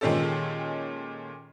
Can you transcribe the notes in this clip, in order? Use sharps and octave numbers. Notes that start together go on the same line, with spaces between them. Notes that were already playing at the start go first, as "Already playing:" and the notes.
A#2 D#3 G#3 C#4 G4 A4